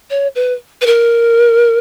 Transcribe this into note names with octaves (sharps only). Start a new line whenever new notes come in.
C#5
B4
B4
A#4